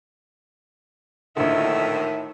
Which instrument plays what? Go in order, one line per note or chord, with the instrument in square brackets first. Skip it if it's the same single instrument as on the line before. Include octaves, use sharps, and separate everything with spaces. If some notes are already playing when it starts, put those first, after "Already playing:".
[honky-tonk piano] A#1 D3 [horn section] A2 D#3 [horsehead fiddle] E5